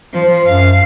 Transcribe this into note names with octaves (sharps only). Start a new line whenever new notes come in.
F3
F#2 F5